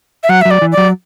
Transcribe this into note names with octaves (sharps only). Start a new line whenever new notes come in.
E5
F#3 F#5
F#3 E5
D5
E3
D5
F#3